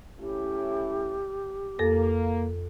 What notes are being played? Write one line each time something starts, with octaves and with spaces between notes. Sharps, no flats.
A2 C#4 E4 G4
F2 A#3 A4 A#6